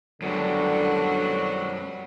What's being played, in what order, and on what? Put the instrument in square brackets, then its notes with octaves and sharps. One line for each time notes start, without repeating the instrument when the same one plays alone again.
[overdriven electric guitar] F#2 B3 [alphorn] D3 [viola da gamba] F#3 G3 F#4